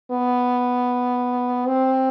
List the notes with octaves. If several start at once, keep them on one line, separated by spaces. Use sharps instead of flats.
B3
C4